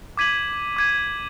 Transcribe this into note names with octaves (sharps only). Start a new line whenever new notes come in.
D6 G#6 B6 D#7 F#7
D6 G#6 D#7